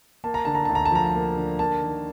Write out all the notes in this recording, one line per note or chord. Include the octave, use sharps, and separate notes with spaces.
A#3 A5
A#5
D3 A5
A#5
D2 A5
A#5
A5
F3 A#5
A5
A#3
D3
A#3 A5
D#3